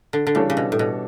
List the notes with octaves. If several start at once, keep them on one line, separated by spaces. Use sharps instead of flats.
D3
D3
C#3 E3 G3 D4 A4 C#5
C#3
B2
A2
B2